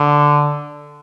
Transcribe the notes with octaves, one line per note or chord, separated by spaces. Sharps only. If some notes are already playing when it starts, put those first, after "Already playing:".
Already playing: D3